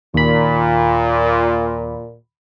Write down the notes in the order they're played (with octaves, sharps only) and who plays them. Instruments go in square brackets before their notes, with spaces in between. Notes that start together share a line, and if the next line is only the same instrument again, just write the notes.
[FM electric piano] D#2 B5 [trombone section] A#2